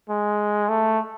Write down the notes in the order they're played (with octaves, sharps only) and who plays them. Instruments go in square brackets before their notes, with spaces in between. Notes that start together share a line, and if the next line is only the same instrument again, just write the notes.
[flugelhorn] G#3
A3